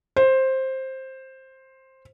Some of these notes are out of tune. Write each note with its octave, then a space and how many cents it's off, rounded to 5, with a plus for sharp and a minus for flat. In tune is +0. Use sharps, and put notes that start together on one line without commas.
C5 +10